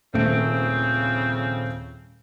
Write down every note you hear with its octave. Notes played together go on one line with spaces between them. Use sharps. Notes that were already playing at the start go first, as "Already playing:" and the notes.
D#1 C#3 F3 A3 C4 D7